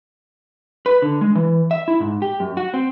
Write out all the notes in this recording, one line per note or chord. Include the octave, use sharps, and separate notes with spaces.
B4
D3
G#3
E3
E5
E4
G#2
G4
F#2
F#4
C4